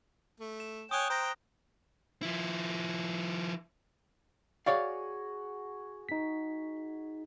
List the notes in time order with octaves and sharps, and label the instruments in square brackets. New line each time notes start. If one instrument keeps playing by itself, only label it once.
[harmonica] A3
[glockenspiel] E7
[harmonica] C#5 G5 G#5 [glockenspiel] D#6 F#6
[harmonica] C5 G5 A#5 [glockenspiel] G6 A#6
[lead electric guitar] F3 E4
[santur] F#4 G#4 [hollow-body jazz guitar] C#5 D5 F5
[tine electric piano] D#4 B6